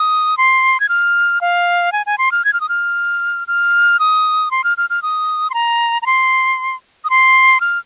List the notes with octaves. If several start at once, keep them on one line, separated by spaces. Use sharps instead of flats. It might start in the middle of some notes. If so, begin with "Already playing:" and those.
Already playing: D#6
C6
G#6
F6
F5
G#5
G#5
C6
F6
G#6
F6
D#6
F6
F6
D#6
C6
F6
F6
F6
D#6
C6
A#5
A#5
C6
D#6
C6
F6